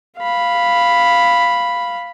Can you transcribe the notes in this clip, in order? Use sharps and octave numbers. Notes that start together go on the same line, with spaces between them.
F5 B5